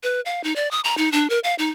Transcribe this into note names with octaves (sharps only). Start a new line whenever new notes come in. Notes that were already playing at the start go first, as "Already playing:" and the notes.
B4
F5
D#4
D5
D#6
A#5
D#4
D4
A#4
F5
D#4